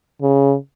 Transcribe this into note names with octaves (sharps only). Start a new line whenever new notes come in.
C#3